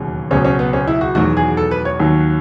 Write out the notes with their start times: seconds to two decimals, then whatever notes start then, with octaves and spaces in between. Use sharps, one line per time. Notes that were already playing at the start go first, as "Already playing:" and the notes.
Already playing: E1 D#2 C#3 F#3
0.31 C#2 B2 F#3 C#4
0.45 C#4
0.59 B3
0.73 C#4
0.87 E4
1.01 F#4
1.15 E1 E2 D#3 F#3 F#4
1.37 G#4
1.57 A4
1.71 B4
1.85 C#5
2.00 D#2 D#3 F#3